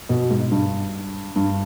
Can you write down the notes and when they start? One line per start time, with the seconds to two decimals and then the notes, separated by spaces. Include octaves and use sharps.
0.09 B2
0.30 G#2
0.51 G2
1.36 G2